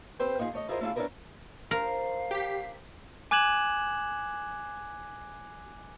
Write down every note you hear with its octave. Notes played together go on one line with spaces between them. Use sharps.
C4 G4 B4 C5 G5
A#3 D#4 F4 F#4 G#4
A3 C#5 D#5
E4 F4 G#4 A#4 C5 D#5
A3 C#4 E4 F4 G#4
C#4 D4 E4 G#4 A#4 B4
F3 A#4 C5 D5 F5
G4 B6
G#5 D6 F#6 G#6 E7 F#7